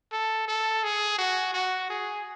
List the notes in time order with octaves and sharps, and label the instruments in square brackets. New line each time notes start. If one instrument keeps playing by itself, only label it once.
[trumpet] A4
A4
G#4
F#4
F#4
G#4